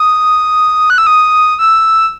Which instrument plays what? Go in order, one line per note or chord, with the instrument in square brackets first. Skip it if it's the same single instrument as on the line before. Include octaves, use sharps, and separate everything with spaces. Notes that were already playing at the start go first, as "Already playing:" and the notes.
Already playing: [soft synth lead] D#6
F#6
E6
D#6
E6